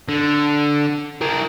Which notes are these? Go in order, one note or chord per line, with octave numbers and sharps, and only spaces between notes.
D3
E4 A#4